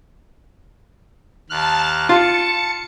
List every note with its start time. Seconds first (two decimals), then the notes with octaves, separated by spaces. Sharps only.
1.50 D#2 A5 F6 F#6
2.09 F4 A5 C#7